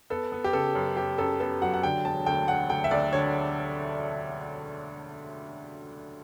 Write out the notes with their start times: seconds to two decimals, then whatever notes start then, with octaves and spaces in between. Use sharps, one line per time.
0.10 B3 A4
0.32 B3
0.44 G4
0.53 C#3 A4
0.75 F#2
0.97 F#2 G4
1.18 F#2 A4
1.40 B3 A4
1.62 F#3 F#5
1.74 F#5
1.83 D3 G5
2.05 E1 A5
2.26 D2 G5
2.48 E1 F#5
2.69 D2 G5
2.84 E5
2.91 D2 D5
3.13 D3 C#5